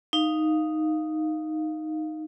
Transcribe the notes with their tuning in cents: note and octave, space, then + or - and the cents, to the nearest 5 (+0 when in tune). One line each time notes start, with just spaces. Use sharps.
D#4 +0 F5 +0